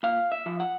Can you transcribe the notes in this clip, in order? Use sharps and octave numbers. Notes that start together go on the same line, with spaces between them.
A#2 F5
E5
F3
F#5